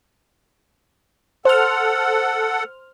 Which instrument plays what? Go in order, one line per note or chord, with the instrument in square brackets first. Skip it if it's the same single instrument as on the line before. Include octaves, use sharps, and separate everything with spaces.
[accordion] A4 F#5 [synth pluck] C5 F6